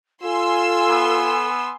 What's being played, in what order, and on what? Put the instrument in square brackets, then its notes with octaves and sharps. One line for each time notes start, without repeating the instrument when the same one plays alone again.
[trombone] F4 [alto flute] A4 [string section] G#5 C6 E6
[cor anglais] B3